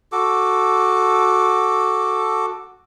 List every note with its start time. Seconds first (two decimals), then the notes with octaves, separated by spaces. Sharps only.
0.12 F#4 A4 D6